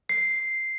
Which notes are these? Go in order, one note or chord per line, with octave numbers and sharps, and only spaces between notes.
C7